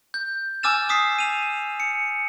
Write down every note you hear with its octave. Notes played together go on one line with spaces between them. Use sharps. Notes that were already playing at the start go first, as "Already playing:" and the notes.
G6
G#5 D6 E6 F6 A6 E7
D6 D#6 B6 C7
D#7 F7
C#7